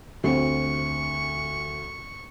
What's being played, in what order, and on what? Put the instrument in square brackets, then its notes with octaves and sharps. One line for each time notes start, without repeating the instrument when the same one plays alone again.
[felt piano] D2 [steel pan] C4 F#4 [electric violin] C#6